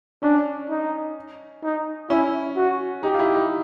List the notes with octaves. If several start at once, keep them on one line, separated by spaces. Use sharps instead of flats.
C#4 D4
D#4
D#4
C#4 E4
F#4
D#4 G4
F4
E4
D#4